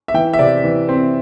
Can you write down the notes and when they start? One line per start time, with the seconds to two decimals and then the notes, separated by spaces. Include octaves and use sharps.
0.08 E5
0.14 E3 G5
0.33 E5
0.39 C3 D5
0.64 E3
0.89 C4